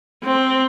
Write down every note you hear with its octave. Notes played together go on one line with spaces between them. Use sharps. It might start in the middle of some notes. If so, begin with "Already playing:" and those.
C4